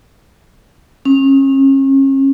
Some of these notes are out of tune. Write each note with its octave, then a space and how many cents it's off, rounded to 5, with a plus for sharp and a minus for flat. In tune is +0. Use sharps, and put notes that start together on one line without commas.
C#4 -35